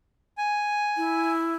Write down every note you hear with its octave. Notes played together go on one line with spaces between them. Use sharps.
G#5
E4